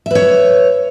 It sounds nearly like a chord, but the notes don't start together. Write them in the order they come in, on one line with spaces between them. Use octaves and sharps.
E5 B4 C#5